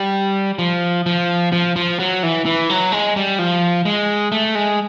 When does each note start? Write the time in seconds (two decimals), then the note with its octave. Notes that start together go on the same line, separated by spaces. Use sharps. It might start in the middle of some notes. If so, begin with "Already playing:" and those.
Already playing: G3
0.59 F3
1.06 F3
1.52 F3
1.76 F3
2.00 F#3
2.23 E3
2.46 E3
2.69 F#3
2.92 G#3
3.16 G3
3.39 F3
3.85 G#3
4.32 A3
4.55 G#3